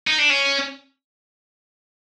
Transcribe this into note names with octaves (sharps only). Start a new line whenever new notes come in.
D#4
D4
C#4